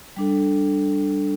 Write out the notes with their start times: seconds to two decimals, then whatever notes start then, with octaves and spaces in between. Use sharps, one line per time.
0.17 G3 D4 A4